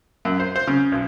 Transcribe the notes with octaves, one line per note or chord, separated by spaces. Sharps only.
F#2
C5
C5
C#3
B1